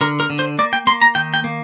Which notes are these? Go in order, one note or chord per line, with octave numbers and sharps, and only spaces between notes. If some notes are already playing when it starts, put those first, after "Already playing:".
D3 A#4
A#4
D3
C5
A#3 D5
G5
A#3 C6
A#5
D#3 G5
G5
A#3